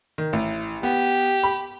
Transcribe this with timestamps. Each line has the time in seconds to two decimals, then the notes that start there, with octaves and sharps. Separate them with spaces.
0.18 D#3
0.33 A1
0.83 B3 G4
1.43 B5